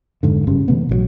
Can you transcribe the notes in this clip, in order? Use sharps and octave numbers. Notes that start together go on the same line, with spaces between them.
F1 B1 G#2 D3
F#1 C#3 G3 C#4
C3 E3 A3 B3
A#1 E3 F#3